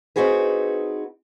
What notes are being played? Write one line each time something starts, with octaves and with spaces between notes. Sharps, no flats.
C4 D#4 F#4 G#4 B4